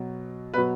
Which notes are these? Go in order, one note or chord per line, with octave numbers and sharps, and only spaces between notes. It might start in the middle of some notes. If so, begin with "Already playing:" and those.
Already playing: B2 F#3
B2 F#3 B4